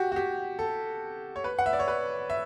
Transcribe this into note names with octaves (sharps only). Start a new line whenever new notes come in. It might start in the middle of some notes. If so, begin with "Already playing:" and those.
Already playing: F#4 G4
F#4
G4
A4
C#5
B4
F#5
E5
D5
C#5
B4
E5